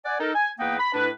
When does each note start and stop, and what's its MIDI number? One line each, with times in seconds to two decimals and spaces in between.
0.06 0.16 74
0.06 0.16 78
0.06 0.16 80
0.20 0.32 63
0.20 0.32 69
0.20 0.32 70
0.34 0.50 80
0.59 0.78 40
0.59 0.78 58
0.59 0.78 59
0.59 0.78 63
0.59 0.78 71
0.59 0.78 79
0.79 0.93 83
0.94 1.09 45
0.94 1.09 62
0.94 1.09 64
0.94 1.09 71